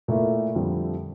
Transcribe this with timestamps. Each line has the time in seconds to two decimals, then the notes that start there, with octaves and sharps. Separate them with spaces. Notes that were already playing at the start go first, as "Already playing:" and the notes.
0.08 A#2 A3 E4 A#4
0.55 F2 D3 G3 C4 F4